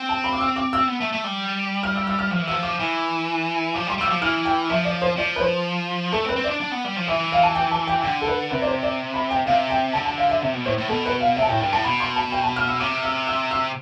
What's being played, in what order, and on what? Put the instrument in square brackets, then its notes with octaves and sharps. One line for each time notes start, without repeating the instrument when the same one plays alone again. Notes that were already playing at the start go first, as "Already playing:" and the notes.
Already playing: [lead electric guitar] C4
[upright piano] A5
B5
D6
E6
D6
E6
[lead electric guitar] B3
A3
A3
G3
[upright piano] F6
E6
E6
F6
[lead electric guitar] F3 [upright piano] F6
[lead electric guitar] E3
[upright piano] E6
[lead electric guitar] F3
[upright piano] D6
[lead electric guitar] E3
[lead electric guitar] F3 [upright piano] D6
[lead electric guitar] G3
[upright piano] C6
[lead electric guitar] G3 [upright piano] E6
[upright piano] D6
[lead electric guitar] F3
[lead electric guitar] E3 [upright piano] F6
[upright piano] G5
[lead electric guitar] F3 [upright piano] E5
[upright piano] D5
C5
[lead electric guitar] F3 [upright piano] D5
[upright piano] B4
C5
[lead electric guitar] A3 [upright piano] A4
[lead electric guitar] C4
[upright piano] B4
[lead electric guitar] C4
[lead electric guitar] D4 [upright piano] D5
[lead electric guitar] D4
B3
G3
F3
[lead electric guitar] E3 [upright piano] E5
[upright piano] F5
A5
G5
A5
G5
[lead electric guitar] D3 [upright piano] G5
[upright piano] A4
B4
[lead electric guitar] C3 [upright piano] B4
[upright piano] D5
C5
D5
B5
G5
[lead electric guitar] C3 [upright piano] F5
[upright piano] G5
[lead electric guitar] D3 [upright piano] A5
[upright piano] A5
F5
E5
[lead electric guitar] C3 [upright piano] E5
[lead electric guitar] B2
[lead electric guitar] A2 [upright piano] C5
[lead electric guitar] A2
[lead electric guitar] B2 [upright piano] A4
[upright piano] B4
F5
[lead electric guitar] C3 [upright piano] E5
[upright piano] A5
[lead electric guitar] A2 [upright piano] G5
[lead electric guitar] G2 [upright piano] G5
[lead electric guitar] A2 [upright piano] A5
[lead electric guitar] B2 [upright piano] B5
[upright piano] C6
A5
G5
A5
F6
E6
[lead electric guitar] C3 [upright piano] D6
[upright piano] E6
E6
E6